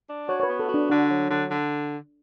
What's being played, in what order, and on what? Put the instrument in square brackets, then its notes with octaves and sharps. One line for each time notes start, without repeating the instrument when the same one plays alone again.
[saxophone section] D4
[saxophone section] F#4 [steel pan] C#5
[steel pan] C#5
B4
[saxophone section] B3
[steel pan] A4
[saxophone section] F#4
[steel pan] D4
[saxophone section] D3 [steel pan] D4
[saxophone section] F#3
D3
D3